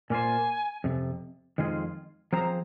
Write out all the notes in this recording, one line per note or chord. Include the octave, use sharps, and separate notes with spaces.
A#2 A#3 F4 C5 G#5
F2 C3
F2 D#3 G#3 F4 G#4
F3 C4 G#4 C5 A#5